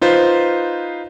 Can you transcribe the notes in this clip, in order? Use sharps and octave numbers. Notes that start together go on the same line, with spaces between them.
D#4 F4 B4 C5